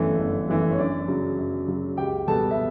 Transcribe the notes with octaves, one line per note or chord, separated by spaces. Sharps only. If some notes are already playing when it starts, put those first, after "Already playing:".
Already playing: G1 F#2 E3 A3 C#4
G1
F#2 E3 A3
C#5
F#2 D4 D5
C#3 F#3
F#2
C#3 F#3
C#2 G4 G5
B2 G3 B3 A4 A5
E5